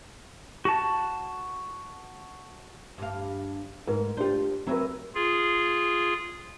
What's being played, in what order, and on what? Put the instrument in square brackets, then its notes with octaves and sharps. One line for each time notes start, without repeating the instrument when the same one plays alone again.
[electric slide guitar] F#4 A5
[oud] G2 F5
[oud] G#2 [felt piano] A#4
[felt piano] D4 G4 [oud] F4 C5
[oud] F#3 B4 E5 [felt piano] C4 A#4
[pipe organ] F4 G#4